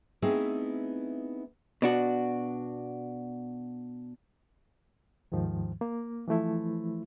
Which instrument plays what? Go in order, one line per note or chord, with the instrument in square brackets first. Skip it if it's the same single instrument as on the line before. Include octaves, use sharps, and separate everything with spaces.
[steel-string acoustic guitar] A3 B3 C4 D#4 E4 G#4
[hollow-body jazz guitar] B2 D4 F#4
[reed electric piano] D#2 G#2 D#3 F3
A#3
E3 F3 A3 E4